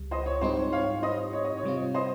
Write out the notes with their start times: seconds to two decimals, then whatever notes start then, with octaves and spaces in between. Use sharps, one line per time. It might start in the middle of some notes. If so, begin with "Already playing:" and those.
Already playing: C#2 C#3 G3
0.11 C5 D#5
0.26 C#5
0.41 G#2 G3 C4 D#4 G4 C5
0.57 C#5
0.73 C#5 F5
1.03 C5 D#5
1.33 C#5
1.45 D#5
1.57 C#5
1.63 C3 G3 C4 F4
1.94 C5 D#5